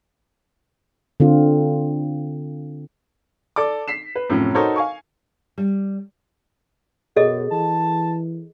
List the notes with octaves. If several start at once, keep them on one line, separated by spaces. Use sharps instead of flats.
D3 C4 F4
A4 D5 D6
B6 C7 E7
B4
F#2 A2 C3 F3 C#4
D#4 F#4 A4 A#4 C5 C#5
F5 G#5 C#6
G3
F#2 B2 G#4 A4 D#5
E3 A5